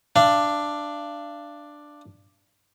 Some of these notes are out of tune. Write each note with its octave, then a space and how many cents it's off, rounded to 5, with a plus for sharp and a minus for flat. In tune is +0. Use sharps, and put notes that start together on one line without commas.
D4 +5 F5 -30